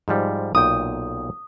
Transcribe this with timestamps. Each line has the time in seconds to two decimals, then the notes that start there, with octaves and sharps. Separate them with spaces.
0.08 G#2 F3 G3
0.55 B1 A#2 G5 D#6